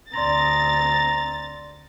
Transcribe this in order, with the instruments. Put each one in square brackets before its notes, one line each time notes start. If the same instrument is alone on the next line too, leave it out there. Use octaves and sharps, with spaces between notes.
[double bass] D2 C4 [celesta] D5 C6 A#6 [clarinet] A#5 [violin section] A6